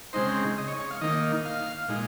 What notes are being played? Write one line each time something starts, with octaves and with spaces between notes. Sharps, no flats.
C#3 G#3 C4 D#4 C5
D#5
C#5
C#5
F5
D#3 A#3 D#4 D#5
F5
A#2 G#3 D#4